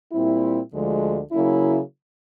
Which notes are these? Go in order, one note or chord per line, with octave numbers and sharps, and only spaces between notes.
A#2 G3 C4 E4
D2 D3 F3 G#3
C#3 F#3 A#3 C#4 E4